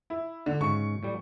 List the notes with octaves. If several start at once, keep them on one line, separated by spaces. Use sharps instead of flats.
E4
D3
G#2 C#3 C#6
A2 G3